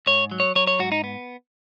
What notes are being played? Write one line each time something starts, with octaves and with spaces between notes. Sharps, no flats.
G#2 C#5
F#3
C#5
F#3 C#5
C#5
G#2 F#4
D#4
B3